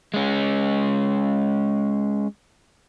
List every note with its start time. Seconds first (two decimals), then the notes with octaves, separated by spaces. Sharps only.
0.14 G#3 C#4